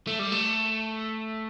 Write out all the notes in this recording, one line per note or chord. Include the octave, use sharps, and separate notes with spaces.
A3
G3
A3